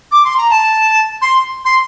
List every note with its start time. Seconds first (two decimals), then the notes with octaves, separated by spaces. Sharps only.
0.12 D6
0.25 C6
0.37 A#5
0.50 A5
1.22 C6
1.65 C6